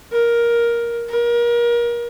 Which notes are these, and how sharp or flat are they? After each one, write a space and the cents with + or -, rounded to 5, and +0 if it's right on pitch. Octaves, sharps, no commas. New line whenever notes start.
A#4 +10
A#4 +30